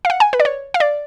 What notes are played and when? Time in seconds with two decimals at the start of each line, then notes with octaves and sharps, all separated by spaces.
0.05 F5
0.10 F#5
0.20 G#5
0.33 B4
0.40 D5
0.45 C#5
0.74 F5
0.80 D5